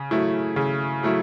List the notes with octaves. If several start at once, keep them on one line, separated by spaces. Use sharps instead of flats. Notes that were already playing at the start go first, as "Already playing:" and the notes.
Already playing: C#3
F#3 A3 E4
C#3
F#3 A3 E4